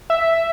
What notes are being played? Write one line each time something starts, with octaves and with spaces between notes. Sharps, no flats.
E5